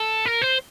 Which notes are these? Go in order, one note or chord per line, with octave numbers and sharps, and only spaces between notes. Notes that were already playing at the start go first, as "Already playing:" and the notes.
Already playing: A4
A#4
C5